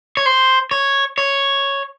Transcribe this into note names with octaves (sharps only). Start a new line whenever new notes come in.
C#5
C5
C#5
C#5